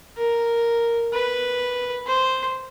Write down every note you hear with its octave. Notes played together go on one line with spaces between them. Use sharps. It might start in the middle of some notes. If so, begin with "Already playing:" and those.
A#4
B4
C5